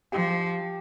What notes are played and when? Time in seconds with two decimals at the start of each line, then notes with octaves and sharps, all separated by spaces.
0.12 F3 G4